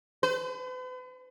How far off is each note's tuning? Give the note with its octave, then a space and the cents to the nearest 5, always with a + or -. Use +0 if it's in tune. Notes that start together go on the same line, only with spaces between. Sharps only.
B4 +45